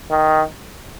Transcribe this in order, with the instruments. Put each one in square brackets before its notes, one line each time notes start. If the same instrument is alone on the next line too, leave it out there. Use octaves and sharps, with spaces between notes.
[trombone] D#3